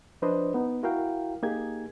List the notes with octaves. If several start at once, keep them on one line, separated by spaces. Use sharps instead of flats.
F3 D4 B4 C5 D5 D#5
B3 D#4
E4 F#4 A#4 F5 G5
A#3 D#4 G4 G#4 G#6